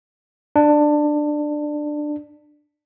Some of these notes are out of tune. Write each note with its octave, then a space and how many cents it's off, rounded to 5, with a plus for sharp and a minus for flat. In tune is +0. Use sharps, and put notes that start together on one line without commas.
D4 +15